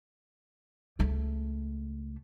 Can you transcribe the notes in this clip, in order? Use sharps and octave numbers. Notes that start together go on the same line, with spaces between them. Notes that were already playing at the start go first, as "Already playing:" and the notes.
C#2 A3